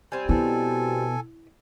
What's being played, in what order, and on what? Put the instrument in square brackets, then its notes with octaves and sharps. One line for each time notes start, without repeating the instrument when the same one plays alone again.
[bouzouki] G3 C4 [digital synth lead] G#5
[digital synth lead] B2 [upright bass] E4 [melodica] A4 G#5